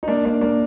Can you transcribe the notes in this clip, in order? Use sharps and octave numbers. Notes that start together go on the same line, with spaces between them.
D#4
A#3 D4
A#3 D4
A#3 D4